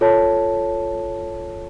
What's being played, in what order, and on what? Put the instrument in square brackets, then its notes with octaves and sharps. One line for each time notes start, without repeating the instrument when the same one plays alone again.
[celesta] F4 A4 C#5 A5